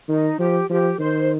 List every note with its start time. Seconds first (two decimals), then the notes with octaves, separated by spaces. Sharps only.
0.08 D#3 D#4
0.39 F3 G4
0.70 F3 G4
0.99 D#3 C5